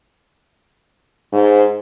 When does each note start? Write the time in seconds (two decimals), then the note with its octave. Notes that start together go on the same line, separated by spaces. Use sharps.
1.33 G#2